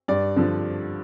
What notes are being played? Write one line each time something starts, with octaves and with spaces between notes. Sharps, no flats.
G2 D5
D3 F3